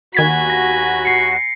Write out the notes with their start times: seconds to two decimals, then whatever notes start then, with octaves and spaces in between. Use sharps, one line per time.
0.14 D#2 D#3 F#4 G#5 B5 G#6 B6
0.50 A#6
1.05 C7 C#7